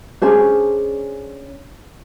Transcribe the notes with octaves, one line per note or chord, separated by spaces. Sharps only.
C#4 D4 G#4 C5